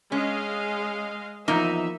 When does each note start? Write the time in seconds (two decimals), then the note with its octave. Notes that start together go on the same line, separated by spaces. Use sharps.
0.12 G#3 C#4 D#5 F5
1.48 E2 F3 A#3 D#4 A#4 E5